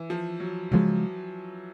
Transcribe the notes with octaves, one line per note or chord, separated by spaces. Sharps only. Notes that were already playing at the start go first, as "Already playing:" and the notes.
Already playing: E3
F3
F#3
C#3 F3 F#3 G#3